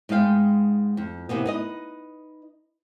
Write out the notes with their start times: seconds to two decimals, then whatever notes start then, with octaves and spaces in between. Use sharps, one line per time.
0.09 G#2 G#3 B3 F5 G5
0.97 F2
1.29 C3 E3 A#3 B3
1.46 D#4 B4 D#5